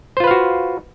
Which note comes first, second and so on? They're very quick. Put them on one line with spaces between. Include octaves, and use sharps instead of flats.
C5 F4 B4 F5 F#4